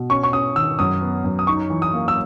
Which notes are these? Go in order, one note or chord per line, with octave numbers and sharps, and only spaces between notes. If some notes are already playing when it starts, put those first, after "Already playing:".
Already playing: B2
C#4 C#6
C#6
C#4 D#6
D#3 E6
F#2 D#6
B3
F#2
D#6
D#4 C#6
E3
D#6
A#3
E6